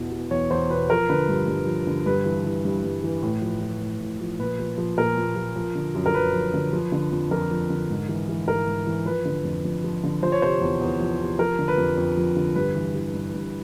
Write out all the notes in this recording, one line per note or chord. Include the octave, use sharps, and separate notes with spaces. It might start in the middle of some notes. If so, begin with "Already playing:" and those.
Already playing: E2 B2 E3
B2
E2 C#5
E2 C5
B2 B4
F3 A#4
D3 B4
G2
G2
F3
D3
G2 B4
E3
E3
G2
G2
E3
A2
F3
F3
A2
A2
F3
A#2 B4
F3
F3
A#2 A#4
A#2
F3
F3
D3
F#2
A#4
F#2 B4
F3
D3
F3
D3
F2
F2 A#4
F3
D3
G#2
E3
E3
G#2 A#4
G#2
E3
F3 B4
D3
F2
F2
F3
D3
F3 C5
C#5
C3 C5
E2
E2
F3
C3
F3 A#4
D3
B4
F2
F2
F3
D3
G2 B4
E3
E3
G2
G2